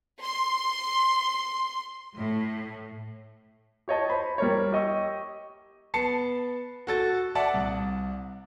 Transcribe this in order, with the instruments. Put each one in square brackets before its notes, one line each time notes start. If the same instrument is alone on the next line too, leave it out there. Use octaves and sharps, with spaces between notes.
[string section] C6
A2
[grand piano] G4 C#5 D#5 A5
C5 B5
G3 A#4 C#5
G4 D#5 C#6 E6
B3 A5 C7 C#7
F#4 A4 A6
D5 E5 F#5 A5
C2